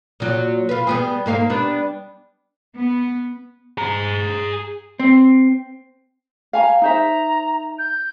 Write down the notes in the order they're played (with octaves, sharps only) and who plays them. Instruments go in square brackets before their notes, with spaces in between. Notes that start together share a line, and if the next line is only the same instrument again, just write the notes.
[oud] A#2 F#3
F4 B4
G3 B3 G#4
G#2 A#3 F5
G3 B3 D4
[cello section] B3
[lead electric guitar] G#4 A#5
[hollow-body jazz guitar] C4
[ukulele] F5 G#5 A#5
[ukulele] D#4 C5 E5 [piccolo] A#5
[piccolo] G6